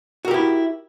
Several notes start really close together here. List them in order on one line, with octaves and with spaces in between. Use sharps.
F#4 A#4 G4 E4